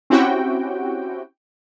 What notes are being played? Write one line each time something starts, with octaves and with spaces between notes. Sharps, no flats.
C4 C#4 E4 F#4 G4 G5